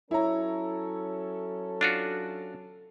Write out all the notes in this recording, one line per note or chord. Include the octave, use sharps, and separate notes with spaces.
F#3 C#4 E4 A4 C#5 A#5
D4 F4 F#4